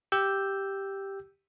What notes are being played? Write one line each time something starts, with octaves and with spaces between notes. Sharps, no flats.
G4 E6 G6